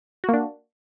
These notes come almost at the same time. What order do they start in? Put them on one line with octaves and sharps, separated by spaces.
F#4 A#3 D4